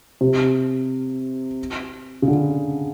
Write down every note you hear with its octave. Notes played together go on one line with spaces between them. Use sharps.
C3
C#3
D3